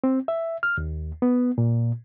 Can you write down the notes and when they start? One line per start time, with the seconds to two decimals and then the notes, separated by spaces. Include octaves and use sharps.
0.04 C4
0.28 E5
0.63 F6
0.78 D#2
1.22 B3
1.58 A#2